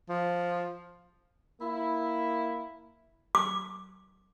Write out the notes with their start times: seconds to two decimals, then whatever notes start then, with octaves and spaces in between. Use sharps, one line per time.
0.09 F3
1.60 A#3 E4
3.35 D6